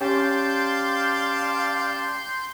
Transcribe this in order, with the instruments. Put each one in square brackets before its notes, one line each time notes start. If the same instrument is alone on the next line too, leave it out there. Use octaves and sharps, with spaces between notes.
[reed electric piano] C#4 G4 [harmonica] D5 F5 [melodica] G5 A5 [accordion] C6 G6